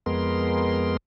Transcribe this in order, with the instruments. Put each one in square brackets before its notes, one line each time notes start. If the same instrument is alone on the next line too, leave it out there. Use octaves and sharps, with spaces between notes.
[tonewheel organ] F2 G#3 B3 A#4 C6